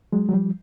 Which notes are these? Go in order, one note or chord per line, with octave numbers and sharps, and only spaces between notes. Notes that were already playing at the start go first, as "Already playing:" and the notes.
F#3 G#3
F#3
F3 G3